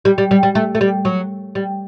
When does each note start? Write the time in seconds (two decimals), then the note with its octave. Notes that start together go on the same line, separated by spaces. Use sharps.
0.05 G3
0.18 G3
0.31 G3
0.43 G3
0.55 A3
0.75 A3
0.81 G3
1.05 F#3
1.55 G3